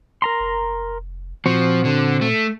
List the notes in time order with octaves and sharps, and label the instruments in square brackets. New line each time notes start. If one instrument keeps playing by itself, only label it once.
[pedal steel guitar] A#4 A#5 C6
[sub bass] F1
[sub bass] A#2 [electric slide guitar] F3 [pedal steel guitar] C4 F#4
[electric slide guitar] D3
A3